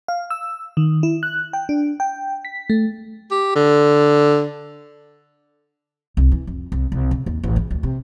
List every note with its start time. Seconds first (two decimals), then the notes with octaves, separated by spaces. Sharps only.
0.08 F5
0.30 E6
0.77 D#3
1.03 E4
1.23 F#6
1.53 G5
1.69 D4
2.00 G5
2.45 B6
2.70 A3
3.31 G4
3.56 D3
6.17 C2
6.31 E3
6.47 F2
6.72 C2
6.92 C2
7.11 C#3
7.26 D#2
7.43 A1
7.56 C#3
7.71 D2
7.83 C3